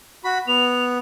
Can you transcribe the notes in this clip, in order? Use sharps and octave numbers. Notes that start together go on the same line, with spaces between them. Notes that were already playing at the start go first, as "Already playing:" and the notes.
F#4 B5
B3 F7